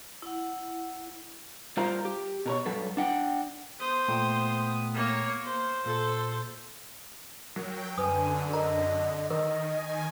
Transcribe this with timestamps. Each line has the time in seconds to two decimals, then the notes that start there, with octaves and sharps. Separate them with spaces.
0.22 E4 F#5
1.77 G3 F4 A#4 C5 F5 A#5
2.05 G4
2.46 B2 A#4 C#5
2.66 G2 F#3 A4 B4
2.97 D4 F#5 G5
3.79 B3 C5 D#6
4.08 A#2 A3 G5
4.94 A#3 C#5
5.44 A#3 C5
5.86 A#2 A4
7.56 F#3 A#4 G5
7.98 F#2 D3 B4 G#5 D#6
8.53 A#4 D#5 A#5
9.30 D#3 A#4 D#5
9.63 G#5